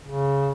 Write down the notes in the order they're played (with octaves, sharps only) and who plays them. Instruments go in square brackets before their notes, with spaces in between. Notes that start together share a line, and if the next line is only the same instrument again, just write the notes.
[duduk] C#3